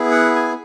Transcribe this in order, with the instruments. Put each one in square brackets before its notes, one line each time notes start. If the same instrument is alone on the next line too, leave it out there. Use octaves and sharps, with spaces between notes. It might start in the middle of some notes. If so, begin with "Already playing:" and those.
Already playing: [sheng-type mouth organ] B3 E4 G#4
F#5
G#5